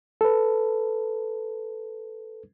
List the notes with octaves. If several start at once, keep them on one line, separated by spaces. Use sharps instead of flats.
A4 B4